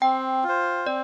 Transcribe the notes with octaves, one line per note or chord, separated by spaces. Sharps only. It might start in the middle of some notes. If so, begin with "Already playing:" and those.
C4 G5
F4
C5
C4 D5